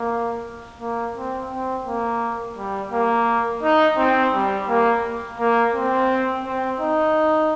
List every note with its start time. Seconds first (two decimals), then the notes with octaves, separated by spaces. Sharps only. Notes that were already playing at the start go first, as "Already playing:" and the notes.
Already playing: A#3
0.81 A#3
1.16 C4
1.51 C4
1.86 A#3
2.57 G3
2.92 A#3
3.63 D#4
3.98 C4
4.33 G3
4.69 A#3
5.39 A#3
5.75 C4
6.45 C4
6.80 D#4